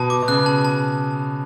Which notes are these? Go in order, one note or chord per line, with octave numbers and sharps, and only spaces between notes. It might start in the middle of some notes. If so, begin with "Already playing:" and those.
Already playing: B2 A5
D6
B2
C#3 F#6
A5
A5